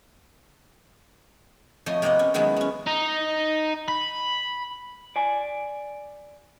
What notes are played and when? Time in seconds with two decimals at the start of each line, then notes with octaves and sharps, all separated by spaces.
1.86 F2 F3 A3 C#5 D#5 G#5
2.02 C3 A#3 B3 D#5 F#5
2.19 C#4
2.34 D#3 F#3 G#3 B3 E4
2.56 B3 C#4
2.87 D#4
3.88 B5
5.16 D5 G#5